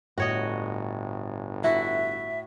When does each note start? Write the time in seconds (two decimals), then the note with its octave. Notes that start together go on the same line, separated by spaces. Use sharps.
0.18 G1 A2 F#4 C#5 D#5
1.64 E4 F#4 E5